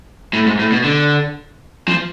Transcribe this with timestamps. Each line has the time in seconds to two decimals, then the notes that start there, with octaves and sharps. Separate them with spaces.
0.33 A2
0.46 G#2
0.59 A2
0.72 B2
0.84 D3
1.88 F3